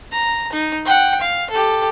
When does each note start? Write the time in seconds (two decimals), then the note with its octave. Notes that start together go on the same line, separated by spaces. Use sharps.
0.12 A#5
0.52 D#4
0.85 F#5 G5
1.20 F5
1.51 G4 A4